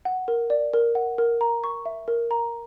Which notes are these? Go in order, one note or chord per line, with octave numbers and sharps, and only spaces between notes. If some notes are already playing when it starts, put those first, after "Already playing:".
F#5
A#4
D5
A#4
F#5
A#4
A#5
C#6
E5
A#4
A#5